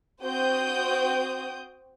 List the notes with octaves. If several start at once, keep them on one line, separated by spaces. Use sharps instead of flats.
C4 F#4 C5 G5 D#6 G6